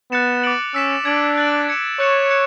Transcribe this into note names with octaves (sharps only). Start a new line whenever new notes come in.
B3 F#6 A6 C#7 E7
D6 A6 D7 F#7
C#4 E6 B6 E7
D4 G#6 D7 F#7
F#6 A6 D7 F#7
G#6 C#7 E7
C#5 C#6 F#6 C#7 E7
F#6 C#7 E7